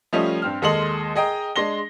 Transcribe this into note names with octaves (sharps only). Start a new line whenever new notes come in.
F3 G3 A3 C#4 F4 D#5
G2 C4 F6
D#2 G#3 A4 D#5 C6 F#7
G#4 D#5 G5 A#5
G#3 D4 C6 A#6 G7